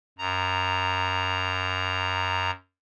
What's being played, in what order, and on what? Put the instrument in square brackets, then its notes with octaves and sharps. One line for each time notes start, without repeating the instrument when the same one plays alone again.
[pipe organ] F#2 A#5